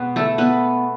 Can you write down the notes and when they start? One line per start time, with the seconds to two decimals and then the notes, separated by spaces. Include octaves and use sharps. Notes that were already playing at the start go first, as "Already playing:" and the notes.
Already playing: B2 G#3 B3 B4
0.16 A3 A4
0.38 B3 B4